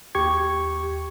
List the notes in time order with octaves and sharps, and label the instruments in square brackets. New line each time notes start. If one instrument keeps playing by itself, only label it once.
[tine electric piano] D#2 G4 C#6 G#6